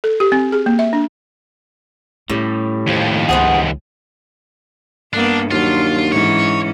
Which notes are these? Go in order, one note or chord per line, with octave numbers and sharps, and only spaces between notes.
A4
G4
C4
G#4
A#3
E5
D4
A2 G3 C#4
D#2 F3
C#2 B3 G#4 C5 F#5
G2 A#3 B3 D4
D#2 F#3 D4 F4
G#2 E3 C#4 C#5